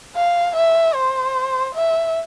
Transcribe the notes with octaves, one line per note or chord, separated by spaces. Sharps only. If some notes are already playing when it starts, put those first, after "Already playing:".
F5
E5
C5
E5